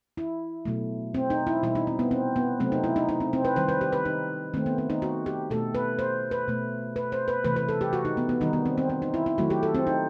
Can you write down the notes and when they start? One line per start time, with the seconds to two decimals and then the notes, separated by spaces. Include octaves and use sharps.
0.17 E4
0.65 B2 F#3 A3
1.14 C4
1.30 D#4
1.47 E4
1.63 B2 G3 E4
1.75 D#4
1.87 C4
1.99 B3
2.11 C4
2.36 B3
2.60 C3 F#3 A3 C4
2.72 D#4
2.84 E4
2.96 D#4
3.09 D#4
3.20 C4
3.33 C4
3.45 B4
3.56 D#3 G3 C5
3.68 B4
3.81 G4
3.92 B4
4.05 D#4
4.54 D#3 A3 C4
4.66 B3
4.78 C4
4.90 D#4
5.02 F#4
5.26 G4
5.51 B2 A3 A4
5.75 B4
5.99 C5
6.31 B4
6.48 B2 A3
6.96 B4
7.12 C5
7.28 B4
7.44 C3 E3 A3 B4
7.56 B4
7.68 A4
7.81 G4
7.93 F#4
8.05 D#4
8.17 B3
8.29 B3
8.41 D#3 G3 D#4
8.53 B3
8.65 C4
8.78 C4
8.90 C4
9.02 D#4
9.14 E4
9.26 E4
9.38 D#3 F#3 A3 F#4
9.50 G4
9.63 A4
9.75 C4
9.87 D#4